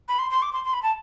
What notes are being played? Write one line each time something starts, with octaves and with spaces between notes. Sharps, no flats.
B5
C6
C6
D6
C6
C6
B5
A5